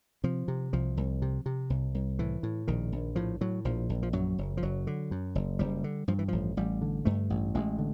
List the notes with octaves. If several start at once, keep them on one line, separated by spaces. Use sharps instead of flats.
C3 F3
C3
C2 F3
C2
C3
C3
C2
C2
A2 E3
A2
A#1 D#3
A#1
A2 F3
A2 F#3
A#1 F3
A#1
F3
F#2 F#3
F#1
F3
F#1 F#3
D3
F#2
F#1
F#1 G3
D3
G2 F3
E3
A1 F3
A1 G3
D3
G2 A3
A1
A1 G#3
D3